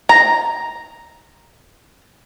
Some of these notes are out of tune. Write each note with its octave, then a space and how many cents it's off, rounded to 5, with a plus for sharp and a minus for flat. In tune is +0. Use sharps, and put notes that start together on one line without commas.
A#5 +0